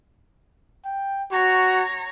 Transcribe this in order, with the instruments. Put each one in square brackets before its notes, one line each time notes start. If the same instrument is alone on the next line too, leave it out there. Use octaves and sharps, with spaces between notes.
[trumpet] G5
[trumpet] F#4 [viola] C#5 A#5